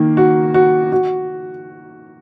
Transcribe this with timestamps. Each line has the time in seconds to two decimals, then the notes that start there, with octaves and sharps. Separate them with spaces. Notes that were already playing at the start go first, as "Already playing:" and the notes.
Already playing: D#3 A#3
0.17 F#4
0.54 F#4
0.92 F#4